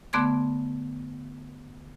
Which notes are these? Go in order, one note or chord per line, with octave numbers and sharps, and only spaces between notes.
D3 A3 B3 C6 D6 G#6